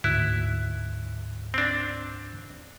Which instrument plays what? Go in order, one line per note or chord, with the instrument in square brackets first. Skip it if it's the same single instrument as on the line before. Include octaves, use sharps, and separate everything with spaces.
[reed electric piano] D2 G#2 F#6 [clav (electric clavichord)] E4
[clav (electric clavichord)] C4 D4